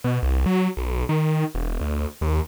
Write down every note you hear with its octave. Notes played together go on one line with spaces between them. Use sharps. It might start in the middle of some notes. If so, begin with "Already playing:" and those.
B2
C2
F#3
B1
D#3
E1
D2
D#2